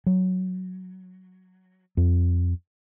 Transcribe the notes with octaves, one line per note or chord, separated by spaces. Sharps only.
F#3
F2